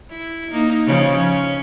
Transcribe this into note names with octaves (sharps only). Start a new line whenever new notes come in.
E4
A#3 D#4
C#3 F3
C#4